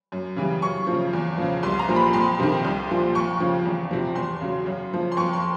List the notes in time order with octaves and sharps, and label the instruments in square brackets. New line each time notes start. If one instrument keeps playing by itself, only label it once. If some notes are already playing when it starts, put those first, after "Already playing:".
[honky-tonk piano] F#2
C#3 E3 G3
F#2 C#6
C#3 F3
E2
C#3 F3
C2 C6
A#5
A#2 F3
B5
F2 C6
C3 D#3
C2
A#2 F3
F2 C#6
C#3 F3
E2
C3 F3
E2 C6
C#3 F#3
F#2
C#3 F3
C6
F2 C#6
C6